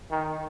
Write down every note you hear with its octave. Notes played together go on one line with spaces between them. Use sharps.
D#3